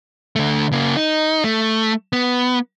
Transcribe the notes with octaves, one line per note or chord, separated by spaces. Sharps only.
D3 A3
C#3 A#3
D#4
A3
B3